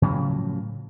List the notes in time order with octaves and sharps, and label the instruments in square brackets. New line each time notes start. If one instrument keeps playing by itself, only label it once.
[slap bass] A2 C#3 F3 F#3